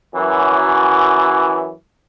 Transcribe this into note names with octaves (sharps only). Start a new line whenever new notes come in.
F#2 E3